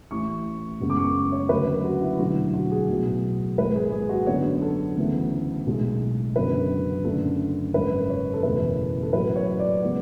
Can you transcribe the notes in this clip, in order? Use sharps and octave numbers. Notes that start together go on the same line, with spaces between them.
A1 A2 E3 C#6
F#1 F#2 C#3 G#3 B3
D6
C#6
C#5
D2 C#3 F#3 B4
F#4
E4
E1 D2 D3 F#3 F#4
F#4
G#4
B1 A2 F#3 B3
G#1 G#2 G#3 B4
G#4
G#4
F#4
F#2 D3 F#3 B3 C#5
A4
D2 C#3 E3 B3
B1 A2 G#3
F#1 F#2 D3 F#3 B3 B4
F#1 F#2 D3 A3 A4
G#1 F#2 C#3 B4
C#5
A4
F#1 E2 B2 A3 B4
A4
A1 A2 F#3 A3 B4
C#5
D5
C#3 G#3 B3